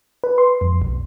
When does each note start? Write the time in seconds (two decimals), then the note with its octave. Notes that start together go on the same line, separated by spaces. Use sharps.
0.24 B4
0.38 C6
0.61 F2
0.82 B1